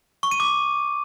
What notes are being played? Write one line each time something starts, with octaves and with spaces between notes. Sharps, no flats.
C#6
D#7
D6